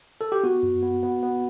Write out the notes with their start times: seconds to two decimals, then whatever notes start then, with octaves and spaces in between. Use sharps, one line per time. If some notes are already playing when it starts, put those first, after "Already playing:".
0.21 A4
0.32 G4
0.44 B3 F#4
0.63 F#2
0.82 B3
1.03 B3
1.23 B3